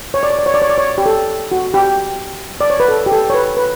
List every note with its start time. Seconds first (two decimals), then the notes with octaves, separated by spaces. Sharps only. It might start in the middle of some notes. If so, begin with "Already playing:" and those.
0.14 C#5
0.23 D5
0.30 C#5
0.39 D5
0.46 C#5
0.54 D5
0.62 C#5
0.70 D5
0.78 C#5
0.98 G4
1.06 A4
1.52 F#4
1.74 G4
2.61 D5
2.70 C#5
2.80 B4
2.88 A4
3.06 G4
3.12 A4
3.30 C#5
3.34 B4
3.57 B4